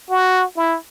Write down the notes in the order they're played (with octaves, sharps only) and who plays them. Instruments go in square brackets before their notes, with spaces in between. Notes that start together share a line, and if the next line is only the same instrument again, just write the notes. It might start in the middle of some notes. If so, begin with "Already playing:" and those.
[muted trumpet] F#4
E4